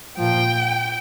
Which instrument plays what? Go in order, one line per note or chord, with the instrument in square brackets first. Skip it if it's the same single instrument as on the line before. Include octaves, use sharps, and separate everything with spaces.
[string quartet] A#2 F3 G5